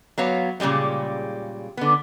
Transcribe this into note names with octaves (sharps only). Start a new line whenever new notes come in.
F#3 B3 C#5 F5
A#2 C#3 F3 G3 G#3
D3 B3